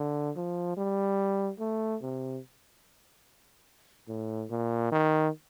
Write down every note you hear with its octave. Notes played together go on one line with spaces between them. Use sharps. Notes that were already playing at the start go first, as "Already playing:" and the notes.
Already playing: D3
F3
G3
A3
C3
A2
A#2
D#3